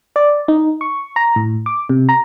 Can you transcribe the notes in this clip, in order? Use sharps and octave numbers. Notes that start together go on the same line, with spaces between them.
D5
D#4
C#6
A#5
A2
D6
C3
A#5